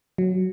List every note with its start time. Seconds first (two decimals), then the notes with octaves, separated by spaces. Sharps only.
0.18 F#3